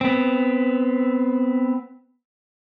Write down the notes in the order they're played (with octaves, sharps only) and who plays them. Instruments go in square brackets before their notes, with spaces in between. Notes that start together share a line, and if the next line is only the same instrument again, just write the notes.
[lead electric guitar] B3 C4